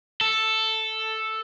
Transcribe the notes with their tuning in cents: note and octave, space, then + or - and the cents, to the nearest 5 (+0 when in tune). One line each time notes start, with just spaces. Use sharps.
A4 +0